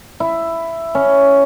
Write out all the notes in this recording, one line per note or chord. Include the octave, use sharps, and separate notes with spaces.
E4
C#4